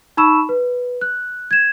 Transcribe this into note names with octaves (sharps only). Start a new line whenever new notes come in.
D#4 A5 B5 C#6 E6 E7
B4
F#6
G#6 E7